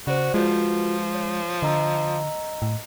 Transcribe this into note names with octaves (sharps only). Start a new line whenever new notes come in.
C#3 F#4 C5 D5
F3 G#3 F4 F#4 B4
C#5
D3 D#5 A#5 E6
A2